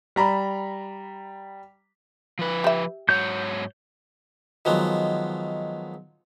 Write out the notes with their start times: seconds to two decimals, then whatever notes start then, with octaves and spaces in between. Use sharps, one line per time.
0.16 G3 A#5 B5
2.39 F3 B4
2.64 G4 E5
3.09 G#2 F#3 C#5 G6
4.65 D#3 F3 F#3 G#3 B3